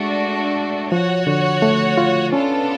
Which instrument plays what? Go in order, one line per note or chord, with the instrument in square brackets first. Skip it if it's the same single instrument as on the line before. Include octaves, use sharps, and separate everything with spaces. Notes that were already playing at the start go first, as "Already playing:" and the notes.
Already playing: [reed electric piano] G#3 [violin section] A3 D4 F#4
[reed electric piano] F3 [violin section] F#4 C#5 F#5
[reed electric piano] D3
A3
F4
[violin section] B3 D4 F4 A4 [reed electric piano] C#4